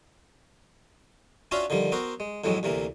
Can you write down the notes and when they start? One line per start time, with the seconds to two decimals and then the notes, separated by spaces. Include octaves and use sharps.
1.51 C#4 D4 F4 F#4 E5 F5
1.70 D3 D#3 F3 G3
1.92 B3 C4 F#4 A#4 C5
2.20 G#3
2.44 F2 A2 E3 F#3 G#3
2.63 D2 C3 E3 A#3